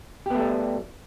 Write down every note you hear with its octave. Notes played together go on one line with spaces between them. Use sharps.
G3 A3 B3 G4